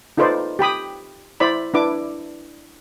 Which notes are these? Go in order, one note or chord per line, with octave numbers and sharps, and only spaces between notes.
D#4 F4 A4 B4 C5 D5
G4 G5 B5 D#6
E4 C5 D5 B5
D4 E4 B4 D6